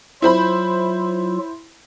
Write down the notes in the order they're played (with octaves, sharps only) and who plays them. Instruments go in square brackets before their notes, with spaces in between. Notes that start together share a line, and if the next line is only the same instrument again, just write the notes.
[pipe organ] F#3 F4 [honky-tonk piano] E4 C5 B5